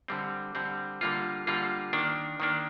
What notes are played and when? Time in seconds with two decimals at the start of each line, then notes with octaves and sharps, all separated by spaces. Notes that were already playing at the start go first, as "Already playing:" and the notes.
0.08 D3 G3 C4
0.55 D3 G3 C4
1.01 D3 G3 A#3 F4
1.47 D3 G3 A#3 F4
1.93 D#3 A#3 D4
2.40 D#3 A#3 D4